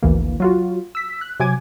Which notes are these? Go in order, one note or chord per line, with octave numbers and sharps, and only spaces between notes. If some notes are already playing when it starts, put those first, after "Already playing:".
G#1 D2 E3 A#3
F#3 F4 F#4
E6 B6
F#6
C3 F#3 G#5 D6 G#6